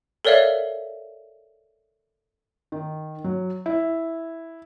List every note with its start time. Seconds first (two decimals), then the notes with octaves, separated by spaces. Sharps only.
0.25 A4 A#4 C#5 D5 E5 F5
2.72 D#3
3.24 F#3
3.66 E4